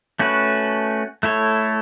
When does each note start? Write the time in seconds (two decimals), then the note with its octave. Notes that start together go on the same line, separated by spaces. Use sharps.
0.19 A3 C#4 F#4 B4
1.23 A3 E4 A4 C#5